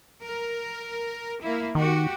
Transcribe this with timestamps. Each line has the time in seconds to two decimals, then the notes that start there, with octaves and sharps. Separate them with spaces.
0.22 A#4
1.42 A#3 E4
1.75 D#3 F#4 G4